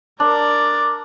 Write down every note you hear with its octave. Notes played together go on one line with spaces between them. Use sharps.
D4 A#4 D5